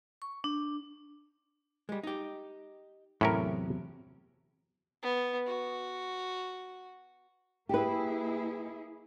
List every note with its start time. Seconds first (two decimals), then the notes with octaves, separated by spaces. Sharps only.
0.22 C#6
0.44 D4
1.89 G3 G#3
2.03 D#4 G4
3.21 E2 A2 C3 F#3 C#4 A#4
5.03 B3
5.47 F#4
7.69 A#3 E4 G4 G#4 B4